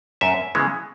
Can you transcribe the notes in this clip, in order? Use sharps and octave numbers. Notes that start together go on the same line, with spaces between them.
F#2 E5
C#3 E3 G#3 B3